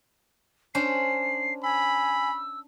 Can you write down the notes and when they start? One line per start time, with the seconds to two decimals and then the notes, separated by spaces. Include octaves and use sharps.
0.75 C#4 D4 C5 C7
1.63 G#5 B5 E6